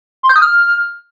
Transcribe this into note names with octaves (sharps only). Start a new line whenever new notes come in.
C6
G6
D#6
F6